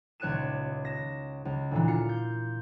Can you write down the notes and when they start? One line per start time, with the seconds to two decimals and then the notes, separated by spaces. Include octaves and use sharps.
0.20 D#1 C#2 C#5 F#6 D#7 E7
0.85 A#6 E7
1.45 C#2
1.71 D2 A#2 E3
1.88 F4 C#7
2.09 G6